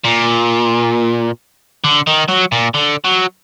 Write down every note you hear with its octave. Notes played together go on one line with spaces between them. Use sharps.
A#2
D3
D#3
F#3
A#2
D3
F#3